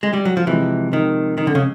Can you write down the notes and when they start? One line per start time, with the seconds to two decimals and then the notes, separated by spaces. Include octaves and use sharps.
0.03 G#3
0.13 G3
0.25 F#3
0.37 F3
0.47 C3 E3 F3 G#3
0.93 D#3
1.38 D#3
1.47 D3
1.55 C#3